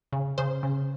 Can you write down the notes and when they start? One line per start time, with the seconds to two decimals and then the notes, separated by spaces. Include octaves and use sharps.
0.13 C#3
0.38 C#3 C5
0.63 C#3